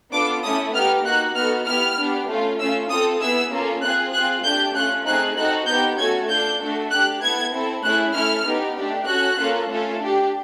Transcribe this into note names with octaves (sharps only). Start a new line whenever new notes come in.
B3 D4 F4 A4 D6
A3 C#4 E4 A4 D#6
B3 D#4 G4 F6
A#3 D#4 F#4 F#6
B3 D#4 F#4 A4 F6
B3 E4 G4 F6
B3 D4 G4
A3 C#4 F4
A3 C#4 F4 E6
C4 F4 A4 D#6
B3 E4 G#4 E6
A#3 C#4 F4 A4
C4 F4 G#4 F#6
C4 F4 G#4 F#6
A3 D4 G4 G6
A3 C#4 F4 F#6
A3 C4 D#4 G#4 F#6
C4 D#4 F#4 A4 F#6
B3 D#4 G4 G6
A3 C#4 F#4 A4 G#6
D4 F4 A4 G6
A3 D4 F#4 A4
D4 G4 F#6
B3 E4 A4 G#6
C4 E4 A4
A3 C#4 E4 G#4 F#6
A3 C#4 E4 A4 F6
B3 D#4 G4
A3 D4 G4
C#4 F#4 A4 F#6
A#3 C#4 F4 A4
A3 C#4 F4 A4
D4 G4